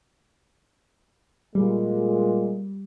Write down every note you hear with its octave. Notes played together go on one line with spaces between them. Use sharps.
A#2 G3 G#3